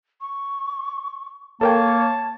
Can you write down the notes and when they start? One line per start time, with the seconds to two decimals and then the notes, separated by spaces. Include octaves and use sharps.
0.21 C#6
1.61 A#3 A4 A#4 C#5 G5 A5